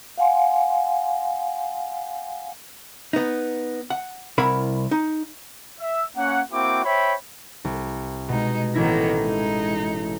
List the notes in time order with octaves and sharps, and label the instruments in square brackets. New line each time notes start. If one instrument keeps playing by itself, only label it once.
[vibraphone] F5 F#5 G#5 C6
[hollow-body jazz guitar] B3 D#4
F#5
C2 E4 A#4 F#5 B5
D#4
[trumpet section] E5
A#3 C#4 F#5
A#3 C4 E4 F#4 G5 D6
C5 C#5 E5 G5 B5
[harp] C2
[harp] B2 [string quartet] G#3 D#4
[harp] A1 E4 A#6 [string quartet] D#3 A#3 B3
[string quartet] G#3 D#4